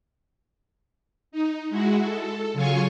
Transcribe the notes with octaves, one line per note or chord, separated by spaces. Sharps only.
D#4
G#3 E4 F#4
A4
C#3 F#3 F4 G#5 C#6